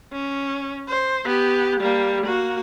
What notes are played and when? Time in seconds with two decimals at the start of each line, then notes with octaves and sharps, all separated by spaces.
0.12 C#4
0.88 C5
1.25 B3 G4
1.80 G3 A#3
2.25 A#3 F#4